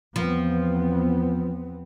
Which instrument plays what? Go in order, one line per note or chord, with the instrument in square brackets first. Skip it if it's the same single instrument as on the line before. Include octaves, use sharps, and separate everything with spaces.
[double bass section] E2 B3 C4 [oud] F3